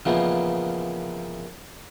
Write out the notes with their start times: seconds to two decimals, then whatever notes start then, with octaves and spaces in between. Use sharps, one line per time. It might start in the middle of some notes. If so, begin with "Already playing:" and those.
0.05 A#2 C#3 E3 F3 B3 D#4